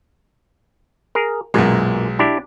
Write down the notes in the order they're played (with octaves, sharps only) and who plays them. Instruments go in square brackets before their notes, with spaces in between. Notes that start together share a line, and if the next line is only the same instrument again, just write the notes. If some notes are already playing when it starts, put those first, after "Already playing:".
[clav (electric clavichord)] G#4 A#4
[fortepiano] B1 G#3 [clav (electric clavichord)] F#2 A#2
[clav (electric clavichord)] D4 E4 G4